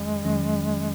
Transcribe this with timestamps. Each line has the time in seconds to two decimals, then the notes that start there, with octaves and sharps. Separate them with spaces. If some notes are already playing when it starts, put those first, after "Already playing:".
Already playing: F2 D#3 F#3 G#3 C#4
0.24 F2 D#3 F#3 C#4